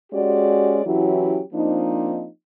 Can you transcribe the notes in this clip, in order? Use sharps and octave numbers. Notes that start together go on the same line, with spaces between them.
G#3 C#4 F#4 G4 D5
E3 F#3 C#4 E4 F#4 G4
F3 A#3 C4 D4 D#4